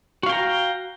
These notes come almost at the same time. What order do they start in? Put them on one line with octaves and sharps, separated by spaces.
F#4 F5 G5 A#5